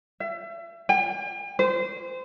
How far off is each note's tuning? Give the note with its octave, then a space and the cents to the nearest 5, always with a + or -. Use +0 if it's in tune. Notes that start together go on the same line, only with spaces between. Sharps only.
E5 +35
G5 +45
C5 -25